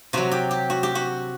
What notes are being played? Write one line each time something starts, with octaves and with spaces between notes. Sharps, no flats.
C3 F#3 F#4
G4
G4
F#4
G4
F#4